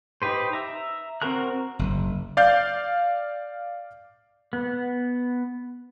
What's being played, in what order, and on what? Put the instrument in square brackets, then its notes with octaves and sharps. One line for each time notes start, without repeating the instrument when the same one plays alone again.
[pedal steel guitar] D#4 G4 B4 C5
E5 A#5
C4 F#4 A#4 A#5 F#6
[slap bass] F#1
[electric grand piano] D5 F5 G6
[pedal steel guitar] B3